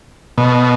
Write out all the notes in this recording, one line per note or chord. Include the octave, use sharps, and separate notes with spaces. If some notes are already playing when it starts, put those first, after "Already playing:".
B2